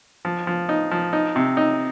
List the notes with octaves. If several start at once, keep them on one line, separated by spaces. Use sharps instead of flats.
F3
F3
D#4
F3
D#4
C3
D#4